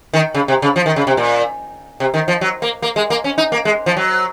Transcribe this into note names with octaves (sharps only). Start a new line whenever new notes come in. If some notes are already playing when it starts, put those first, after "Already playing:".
D#3
C#3
C3
C#3
F3
D#3
C#3
C3
A#2
C3
D#3
F3
F#3
A#3
A#3
G#3
A#3
C#4
D#4
A#3
G#3
F3
F#3